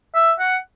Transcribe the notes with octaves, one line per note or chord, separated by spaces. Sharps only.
E5
F#5